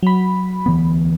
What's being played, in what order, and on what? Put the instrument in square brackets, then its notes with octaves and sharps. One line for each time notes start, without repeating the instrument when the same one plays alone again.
[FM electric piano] F#3 B5
[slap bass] D2 E3 B3